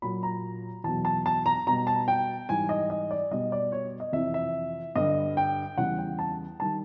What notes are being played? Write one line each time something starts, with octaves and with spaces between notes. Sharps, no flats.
A#2 F#3 B5
A#5
E2 B2 F#3 A5
A5
A5
A#5
B2 G3 A#5
A5
G5
G#2 E3 G3 G#5
D#5
D#5
D5
B2 G3 D#5
D5
C#5
D#5
F2 C3 E3 E5
E5
G2 D3 G3 D#5
G5
E2 C#3 E3 G3 F#5
G5
A5
D#3 G3 A5